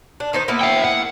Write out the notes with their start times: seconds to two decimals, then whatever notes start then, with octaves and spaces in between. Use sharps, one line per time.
0.20 D4
0.33 D#3 D#4 C5
0.48 A#3 B3 E4
0.61 E5 G5
0.84 F#5